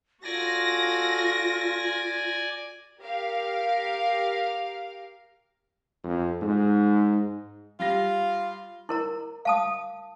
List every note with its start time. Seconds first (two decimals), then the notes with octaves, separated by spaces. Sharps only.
0.24 F4 F#4 A4 D5 G#5 A#6
3.01 G4 A#4 F5
6.04 F2
6.42 G#2
7.80 G3 F4 A#6
8.89 E4 A#4 A#5
9.45 F5 A5 D#6